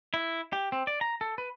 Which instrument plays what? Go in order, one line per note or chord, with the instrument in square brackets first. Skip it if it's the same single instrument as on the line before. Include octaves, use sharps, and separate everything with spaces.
[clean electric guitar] E4
G4
C4
D5
A#5
A4
B4